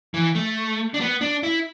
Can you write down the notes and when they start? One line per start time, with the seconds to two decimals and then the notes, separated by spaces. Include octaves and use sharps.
0.14 E3
0.35 A3
0.94 D4
1.01 B3
1.21 D4
1.43 E4